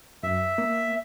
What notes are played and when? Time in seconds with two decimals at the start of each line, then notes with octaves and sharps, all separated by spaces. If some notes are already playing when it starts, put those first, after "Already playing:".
0.23 F#2 E5
0.58 A#3